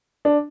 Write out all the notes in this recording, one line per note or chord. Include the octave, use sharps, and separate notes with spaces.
D4